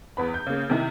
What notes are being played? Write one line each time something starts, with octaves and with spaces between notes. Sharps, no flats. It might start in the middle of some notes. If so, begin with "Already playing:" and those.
E2 B3 B5
G6
C#3 A#3
C3 D#3 E4